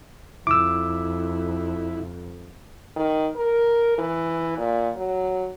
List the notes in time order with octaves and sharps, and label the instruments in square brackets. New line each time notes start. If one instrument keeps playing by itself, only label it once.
[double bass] F2 [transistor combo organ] E4 [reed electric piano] D6 E6
[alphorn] D#3
A#4
E3
A#2
F#3